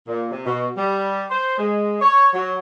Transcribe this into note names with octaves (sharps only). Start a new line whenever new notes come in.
A#2
C3
B2
G3
C5
G#3
C#5
F#3